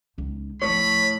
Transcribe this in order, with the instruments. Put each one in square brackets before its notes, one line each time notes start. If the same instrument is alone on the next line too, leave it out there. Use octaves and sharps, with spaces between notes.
[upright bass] C#2 D#4
[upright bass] D2 F3 [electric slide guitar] A2 C#5 [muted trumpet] B5